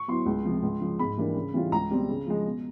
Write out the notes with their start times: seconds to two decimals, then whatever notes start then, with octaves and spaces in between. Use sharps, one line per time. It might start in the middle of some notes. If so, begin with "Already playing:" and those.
Already playing: C#6
0.08 F#3 B3 E4 C6
0.26 C#2
0.45 C3 F3
0.63 C#2
0.81 C#3 F3
0.99 G#2 B5
1.17 E3 G3 A#3 D4
1.36 C#3
1.54 E3 G3 C4 F4
1.72 C#2 A#5
1.90 B2 G3 C4
2.09 C#3
2.27 F3 G#3
2.46 B2